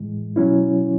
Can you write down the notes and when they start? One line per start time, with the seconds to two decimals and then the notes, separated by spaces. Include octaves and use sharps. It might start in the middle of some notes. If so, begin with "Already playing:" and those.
Already playing: A2 E3 G#3
0.36 B2 F#3 C#4 E4